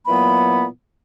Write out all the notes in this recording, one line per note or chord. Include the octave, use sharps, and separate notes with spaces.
A#2 E3 F#3 A#3 B3 B5